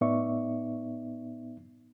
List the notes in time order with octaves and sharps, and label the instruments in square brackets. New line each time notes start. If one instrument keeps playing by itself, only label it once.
[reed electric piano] A2 B3 D#4 D5 E5 C#6